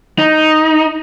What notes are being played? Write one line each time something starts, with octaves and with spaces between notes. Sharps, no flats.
D#4